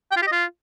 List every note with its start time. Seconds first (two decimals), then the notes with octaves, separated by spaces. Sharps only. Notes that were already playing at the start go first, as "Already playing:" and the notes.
0.12 G5
0.17 F4
0.22 G4
0.27 D#5
0.32 F4